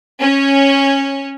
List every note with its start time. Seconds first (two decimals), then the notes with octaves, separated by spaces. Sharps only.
0.20 C#4